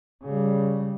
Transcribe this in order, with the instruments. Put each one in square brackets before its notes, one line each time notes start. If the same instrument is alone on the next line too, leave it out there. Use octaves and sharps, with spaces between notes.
[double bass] C#3 G3